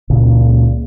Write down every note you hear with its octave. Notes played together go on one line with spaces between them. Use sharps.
C#2 A#2 C#3